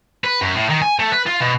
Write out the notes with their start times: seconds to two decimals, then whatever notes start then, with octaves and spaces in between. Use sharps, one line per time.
0.24 B4
0.41 F#2
0.55 A2
0.69 D#3
0.82 G#5
0.99 A3
1.12 B4
1.27 F4
1.41 B2